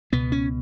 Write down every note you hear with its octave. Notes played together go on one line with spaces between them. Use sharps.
C#2 B2 B3
C#4